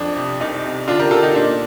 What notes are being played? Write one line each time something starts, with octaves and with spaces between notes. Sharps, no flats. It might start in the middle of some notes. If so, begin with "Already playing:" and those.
Already playing: F2 D4
C3
C2 D#4
C3
D3 D4 F4
G4 A#4
D3 F4 A4
D#4 G4
A#2 D4